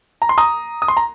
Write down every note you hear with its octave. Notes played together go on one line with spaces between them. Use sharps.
A#5
C6
A#5 D#6
D#6
C6
A#5